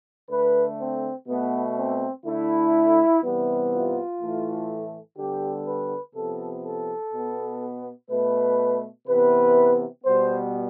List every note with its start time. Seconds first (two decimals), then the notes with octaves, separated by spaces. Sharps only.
0.30 D3 A3 B4
0.80 C4
1.28 B2 A3 B3
1.77 C4
2.25 D3 A3 E4
3.23 C3 E3 G3 B3
3.72 F4
4.21 A2 E3 A3
5.18 D3 G3 B3 G4
5.67 B4
6.15 C3 F3 B3 A4
6.64 A4
7.12 B2 B3
8.10 B2 A3 B4
9.08 C3 E3 B3 B4
10.04 B2 G3 B3 C5